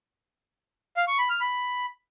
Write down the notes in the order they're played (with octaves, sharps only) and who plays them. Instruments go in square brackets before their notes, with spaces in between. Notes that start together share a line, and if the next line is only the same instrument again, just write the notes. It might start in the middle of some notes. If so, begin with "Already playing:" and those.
[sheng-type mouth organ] F5
C#6
B5
F6
B5